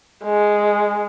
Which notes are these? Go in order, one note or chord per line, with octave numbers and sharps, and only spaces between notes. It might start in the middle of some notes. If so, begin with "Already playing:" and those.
G#3